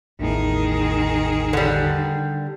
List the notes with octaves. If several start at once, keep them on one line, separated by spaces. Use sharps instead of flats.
A1 E2 A2 D#3 G#4
D3 G3